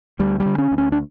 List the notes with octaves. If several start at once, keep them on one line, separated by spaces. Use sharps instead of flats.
D2 G3
G3
D3
C#4
D2
C#4
D4